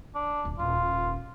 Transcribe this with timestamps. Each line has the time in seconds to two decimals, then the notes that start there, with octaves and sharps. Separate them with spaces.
0.15 D4
0.44 D1 G#1
0.59 D#1 F4